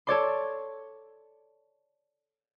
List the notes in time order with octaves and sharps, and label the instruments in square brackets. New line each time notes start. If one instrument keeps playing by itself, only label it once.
[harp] A4 C#5 D5 C6